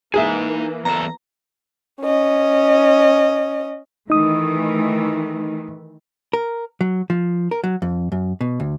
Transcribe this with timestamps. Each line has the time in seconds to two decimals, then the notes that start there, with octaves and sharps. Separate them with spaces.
0.14 E3 A#3 D#4 G#4 E5 G#5
0.85 E2 A4 A#5
2.02 C#4 D#5
4.10 D#3 E3 A3 D#4 D#6
6.33 A#4
6.81 F#3
7.10 F3
7.51 A#4
7.64 F#3
7.82 F2
8.12 F#2
8.41 B2
8.60 D2